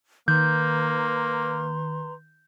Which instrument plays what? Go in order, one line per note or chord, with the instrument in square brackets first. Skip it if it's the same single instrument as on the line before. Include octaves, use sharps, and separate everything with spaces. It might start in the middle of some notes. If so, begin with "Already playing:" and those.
[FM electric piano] D#3 [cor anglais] A#3 [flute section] B4 A#5 C6 [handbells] G6